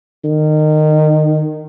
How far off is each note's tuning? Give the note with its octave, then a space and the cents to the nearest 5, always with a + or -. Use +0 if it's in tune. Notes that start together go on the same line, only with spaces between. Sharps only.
D#3 -25